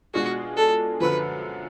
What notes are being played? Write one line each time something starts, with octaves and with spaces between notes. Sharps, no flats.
B2 G#3 D4 F4 F#4 G#4
A4
F#2 D3 F3 B4